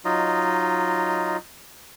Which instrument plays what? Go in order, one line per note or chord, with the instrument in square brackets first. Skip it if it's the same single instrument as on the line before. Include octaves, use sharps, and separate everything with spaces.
[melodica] F#3 D#4 F4 D#5